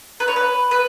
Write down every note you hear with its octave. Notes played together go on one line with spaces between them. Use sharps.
B4
C#5
B4
B4